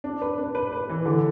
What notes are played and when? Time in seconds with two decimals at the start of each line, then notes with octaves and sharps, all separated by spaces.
0.04 D4
0.21 B4
0.38 D4
0.55 B4
0.72 B4
0.89 E3
1.05 D3